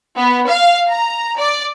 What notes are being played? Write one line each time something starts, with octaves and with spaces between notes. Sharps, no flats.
B3
F5
A#5
D5